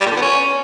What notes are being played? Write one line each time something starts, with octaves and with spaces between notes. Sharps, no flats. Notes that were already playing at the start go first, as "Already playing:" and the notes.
G3
A#2
D3
B3
C#4